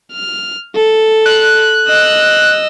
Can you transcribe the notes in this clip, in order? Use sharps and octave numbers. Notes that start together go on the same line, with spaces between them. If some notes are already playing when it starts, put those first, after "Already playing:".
F6
A4
F#6
D#5 E6